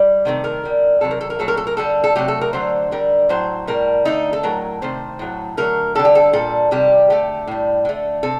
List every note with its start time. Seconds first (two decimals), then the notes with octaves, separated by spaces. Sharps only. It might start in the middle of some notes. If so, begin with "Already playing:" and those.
Already playing: G3
0.25 C3 D#3 F#3 A3
0.44 A#4
0.64 D3 G3
1.01 C3 D#3 F#3 A4
1.11 A#4
1.21 A4
1.30 A#4
1.39 A#2 F#3 A3 A4
1.48 A#4
1.57 A4
1.67 A#4
1.77 D3 G3 A4
2.04 A4
2.15 C3 F#3 A3 G4
2.28 A4
2.41 A#4
2.53 D3 F#3 A3 C5
2.91 D3 G3 A#4
3.29 A2 F#3 A3 C5
3.67 A2 G3 A#4
4.05 D3 A3 D#4
4.33 A4
4.43 A2 F#3 A3 A#4
4.82 C3 D#3 A3 C5
5.19 A2 F#3 A3
5.57 D3 F#3 A3 A#4
5.95 D3 G3 A4
6.05 G4
6.15 A4
6.33 A#2 G3 A4
6.71 C3 D#3 G3 G4
7.10 D3 A3 G4
7.47 A2 G3
7.85 D3 A3
8.23 C3 A4